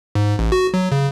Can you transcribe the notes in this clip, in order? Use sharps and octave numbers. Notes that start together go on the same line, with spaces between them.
G#2
A1
F#4
F#3
C#3